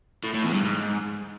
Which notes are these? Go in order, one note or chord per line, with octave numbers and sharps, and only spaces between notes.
A2
A2
E2
G2
G#2